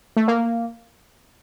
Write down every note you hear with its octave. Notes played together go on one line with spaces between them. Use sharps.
A3
A#3